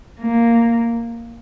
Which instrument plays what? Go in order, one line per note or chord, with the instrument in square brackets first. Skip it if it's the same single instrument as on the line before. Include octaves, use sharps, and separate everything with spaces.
[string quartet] A#3